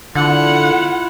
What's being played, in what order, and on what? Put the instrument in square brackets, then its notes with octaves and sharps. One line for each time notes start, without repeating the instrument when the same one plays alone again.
[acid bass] D3 [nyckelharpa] E4 F4 [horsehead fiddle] F#5